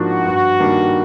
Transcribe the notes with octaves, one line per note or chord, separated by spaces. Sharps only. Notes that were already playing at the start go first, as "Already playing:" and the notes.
Already playing: G#2 F3 A#3 D4 F#4
G2
D#3 G3 A#3 D4